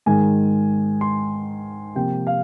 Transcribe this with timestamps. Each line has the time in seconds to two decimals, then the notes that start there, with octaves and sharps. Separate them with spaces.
0.06 G#2 D#3 G#3 G#5
1.01 C6
1.95 C3 F3 A#3 G5
2.27 F5